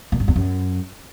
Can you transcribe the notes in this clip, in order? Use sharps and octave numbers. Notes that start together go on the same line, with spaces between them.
A#2
G2
E2
F#2